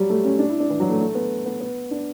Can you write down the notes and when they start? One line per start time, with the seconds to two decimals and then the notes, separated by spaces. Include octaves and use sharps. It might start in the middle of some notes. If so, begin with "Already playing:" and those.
Already playing: F#3 G3
0.10 A3
0.24 C#4
0.39 D4
0.49 E4
0.60 D4
0.70 E3
0.80 F#3
0.90 A3
1.00 A3
1.15 B3
1.46 B3
1.61 B3
1.91 D4